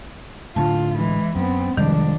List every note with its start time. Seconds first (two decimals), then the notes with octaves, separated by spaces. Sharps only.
0.56 A2 D3 F4 A5
0.97 E3 G#3
1.36 F#2 B3 C4
1.77 F2 C3 D#3 G3 G#3 D4